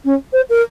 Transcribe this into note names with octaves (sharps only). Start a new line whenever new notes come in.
C#4
C5
A#4